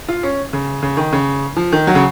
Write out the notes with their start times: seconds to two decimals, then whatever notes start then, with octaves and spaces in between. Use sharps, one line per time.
0.08 F4
0.23 C#4
0.53 C#3
0.83 C#3
0.97 D#3
1.13 C#3
1.57 F3
1.72 D#3
1.87 F#3
1.95 C#3